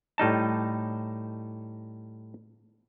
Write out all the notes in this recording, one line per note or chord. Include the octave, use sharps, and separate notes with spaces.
A2 G3 D#4 A5